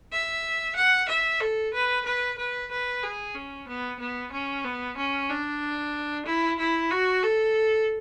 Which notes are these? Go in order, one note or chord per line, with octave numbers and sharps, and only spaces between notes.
E5
F#5
E5
A4
B4
B4
B4
B4
G#4
C#4
B3
B3
C#4
B3
C#4
D4
E4
E4
F#4
A4